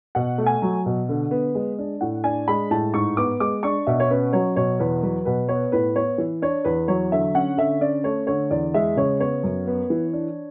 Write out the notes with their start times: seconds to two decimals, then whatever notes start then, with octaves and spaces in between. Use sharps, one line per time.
0.15 B2 F#5
0.38 A3
0.46 G#5
0.62 F#3
0.86 B2
1.09 D3
1.31 B3
1.55 G#3
1.79 D4
2.01 A2 F#5
2.24 D4 G#5
2.48 G#3 B5
2.71 A2 A5
2.94 G#2 C#6
3.17 B3 D6
3.40 G#3 D6
3.63 D4 C#6
3.87 B2 E5
4.00 C#5
4.10 C#4 B4
4.33 F#3 C#5
4.56 B2 C#5
4.79 E2 B4
5.02 F#3 B4
5.25 B2 B4
5.49 B3 C#5
5.72 A2 B4
5.95 B3 C#5
6.18 E3
6.42 D4 C#5
6.65 E2 B4
6.88 F#3 C#5
7.12 D3 E5
7.34 C#4 F#5
7.57 D3 E5
7.81 C#4 D5
8.04 A3 C#5
8.27 D3 C#5
8.50 E2 D5
8.74 G#3 E5
8.97 C#3 C#5
9.20 B3 C#5
9.43 F#2
9.67 B3
9.90 E3
10.13 D4